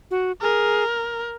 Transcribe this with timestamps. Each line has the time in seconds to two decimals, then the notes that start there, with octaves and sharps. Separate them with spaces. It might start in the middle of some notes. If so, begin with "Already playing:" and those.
0.11 F#4
0.41 G#4 A#4